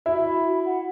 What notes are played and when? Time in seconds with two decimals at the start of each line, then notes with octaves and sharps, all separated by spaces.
0.06 E4 F#4 E5
0.26 B5
0.45 F#4
0.65 F#5